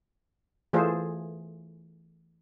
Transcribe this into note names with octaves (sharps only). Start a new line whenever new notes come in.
E3 A3 F4 G#4 A4 C5